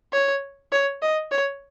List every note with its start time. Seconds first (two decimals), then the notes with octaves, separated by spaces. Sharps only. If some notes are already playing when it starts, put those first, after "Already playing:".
0.13 C#5
0.72 C#5
1.02 D#5
1.32 C#5